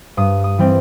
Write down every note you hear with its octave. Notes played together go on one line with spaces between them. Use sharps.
G2 D#6
D#6
E3 G3 C4